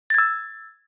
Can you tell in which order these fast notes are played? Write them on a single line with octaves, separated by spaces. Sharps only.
A6 G#6 E6